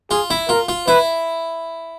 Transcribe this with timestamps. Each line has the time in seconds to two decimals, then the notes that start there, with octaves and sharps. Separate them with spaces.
0.10 F4 G#4
0.30 E4
0.49 F4 A#4
0.69 F4
0.87 E4 B4